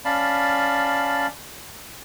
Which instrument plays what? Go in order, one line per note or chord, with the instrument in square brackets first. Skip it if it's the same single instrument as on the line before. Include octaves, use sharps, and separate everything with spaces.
[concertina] C#4 D5 F5 A5 B5